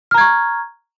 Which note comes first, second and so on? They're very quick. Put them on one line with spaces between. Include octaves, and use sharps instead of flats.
F6 A#5 G#6 C#6